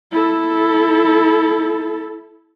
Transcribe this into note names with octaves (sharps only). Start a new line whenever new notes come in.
E4 A4